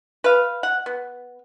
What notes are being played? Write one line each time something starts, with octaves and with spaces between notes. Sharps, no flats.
B4 F5
F#5
B3